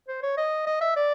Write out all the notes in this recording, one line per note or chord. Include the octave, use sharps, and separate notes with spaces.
C5
C#5
D#5
D#5
E5
D5